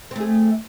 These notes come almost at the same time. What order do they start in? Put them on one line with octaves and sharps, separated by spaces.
C4 A3 G#4